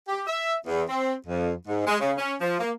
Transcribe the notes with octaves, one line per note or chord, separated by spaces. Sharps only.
G4
E5
E2
C4
F2
G#2
G#3
C#3
C#4
F3
A#3